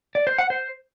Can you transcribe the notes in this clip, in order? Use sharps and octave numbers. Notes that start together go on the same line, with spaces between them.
D5
C5
F#5
C5